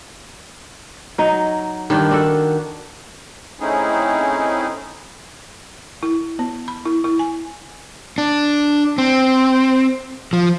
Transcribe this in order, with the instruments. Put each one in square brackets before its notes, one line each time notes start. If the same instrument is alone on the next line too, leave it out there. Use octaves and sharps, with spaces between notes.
[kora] F#3 D#4
[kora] G2 D4 [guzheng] D#3
[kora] D4 F#4 A4
[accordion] A3 C4 C#4 D#4 E4 G#4
[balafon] E4
B3
B5
E4
E4
G#5
[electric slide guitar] D4
C4
F3